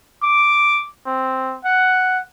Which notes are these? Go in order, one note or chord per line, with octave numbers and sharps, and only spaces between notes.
D6
C4
F#5